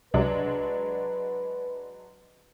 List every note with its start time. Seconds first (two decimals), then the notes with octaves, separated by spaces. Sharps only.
0.14 C2 F#3 G#3 D4 B4